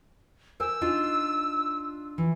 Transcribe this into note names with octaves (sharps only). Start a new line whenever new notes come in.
A#4 C5 G#5 E6
D4 D#4 F4
E3